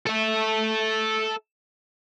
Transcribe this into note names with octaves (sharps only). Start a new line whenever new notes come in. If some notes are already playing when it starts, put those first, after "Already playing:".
A4 E5